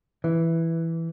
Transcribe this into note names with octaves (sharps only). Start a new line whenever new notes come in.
E3